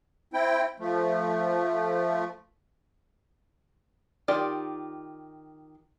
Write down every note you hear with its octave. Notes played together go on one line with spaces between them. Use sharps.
C4 E4 G5
F3 A3
D#3 F4 G4 D5